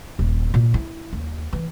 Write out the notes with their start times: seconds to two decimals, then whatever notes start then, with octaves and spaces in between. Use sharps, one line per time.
0.19 D#1
0.54 A#2
0.74 E4
1.13 D#2
1.53 E3